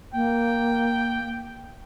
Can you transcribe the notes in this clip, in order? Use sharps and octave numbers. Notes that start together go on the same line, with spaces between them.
A#3 G5